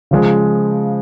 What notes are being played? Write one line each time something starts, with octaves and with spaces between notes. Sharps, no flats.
C#3 F3 G#3